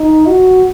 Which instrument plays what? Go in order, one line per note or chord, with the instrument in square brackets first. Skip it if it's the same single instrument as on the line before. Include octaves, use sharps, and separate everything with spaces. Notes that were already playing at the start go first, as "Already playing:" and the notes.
Already playing: [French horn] D#4
F#4